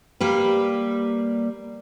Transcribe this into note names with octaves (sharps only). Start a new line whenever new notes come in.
G3 A#3 B4